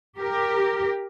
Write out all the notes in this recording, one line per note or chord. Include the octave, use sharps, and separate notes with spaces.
G4 A#4